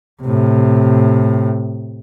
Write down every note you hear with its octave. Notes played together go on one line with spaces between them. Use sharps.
A2 C3